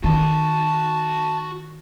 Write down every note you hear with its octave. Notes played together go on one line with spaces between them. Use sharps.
D#3 F#4 A5 C6